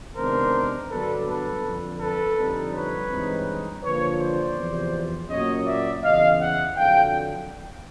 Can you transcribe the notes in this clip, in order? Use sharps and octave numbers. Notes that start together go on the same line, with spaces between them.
C3 D#3 G#3 B3 D4 A#4 C5
G2 D3 F#3 B3 D4 A4 B4
A4 B4
F2 D3 F3
A4 B4
F2 D3 G3 C4 D#4
B4 C#5
G2 E3 G#3 C4 D#4
D3 F3 A#3 B4 C#5
C5 D5
E2 C3 F3
A#2 F#3 A#3 C#4 C#5 D#5
D5 E5
E2 C#3 E3 D#5 F5
E5 F#5
F2 D3 F#3 F5 G5